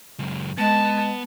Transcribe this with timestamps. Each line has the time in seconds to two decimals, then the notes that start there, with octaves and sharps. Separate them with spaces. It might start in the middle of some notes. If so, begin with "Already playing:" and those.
0.19 C#2 F#2
0.58 G#3 B3 A5